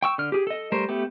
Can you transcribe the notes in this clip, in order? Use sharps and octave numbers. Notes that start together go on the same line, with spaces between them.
G5 C#6 E6
D3 F6
G4 G#4
A4 D#5
G3 A3 A#4 C5
A3 B3 G4